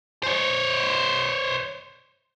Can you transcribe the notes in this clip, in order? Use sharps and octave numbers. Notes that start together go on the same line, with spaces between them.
C5 C#5